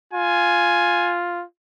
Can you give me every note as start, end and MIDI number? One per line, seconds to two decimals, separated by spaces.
0.13 1.44 65
0.13 1.17 80